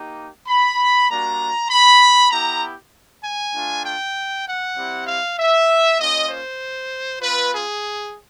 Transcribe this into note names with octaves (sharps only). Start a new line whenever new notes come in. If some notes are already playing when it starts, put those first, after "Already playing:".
Already playing: A#3 D#4 G4
B5
G3 A#3 D4 F#4 A#5
B5
B3 E4 G4 A#5
G#5
A3 D4 F4
G5
F#5
G3 C4 E4 G4
F5
E5
A#3 C#4 F4 D#5
C5
C4 F4 B4
G#4